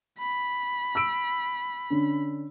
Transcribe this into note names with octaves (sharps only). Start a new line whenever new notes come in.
B5
E6 D7
D3 C#4